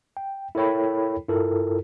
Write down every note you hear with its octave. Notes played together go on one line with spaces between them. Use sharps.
G5
E4 A4 A#4 C#5 G5 B5
G2 E4 F4 A4 A#4